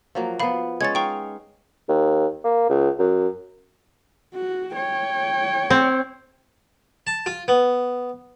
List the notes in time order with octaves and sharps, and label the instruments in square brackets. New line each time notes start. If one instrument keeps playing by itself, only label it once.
[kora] F3 F#3 A#3
[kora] F3 B3 [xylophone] F5 B5
[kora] G#3 C#4 C#5 [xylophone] G#6 A6
[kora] D#4 F5 [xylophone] G5 C#6
[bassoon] D#2
A#3
C#2
F#2
[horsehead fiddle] F#4
C#5 G5
[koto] C4
[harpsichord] A5
F4
B3